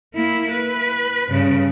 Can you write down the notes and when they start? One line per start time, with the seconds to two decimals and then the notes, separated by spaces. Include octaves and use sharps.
0.14 A#3 E4
0.51 B4
1.28 G2 C#3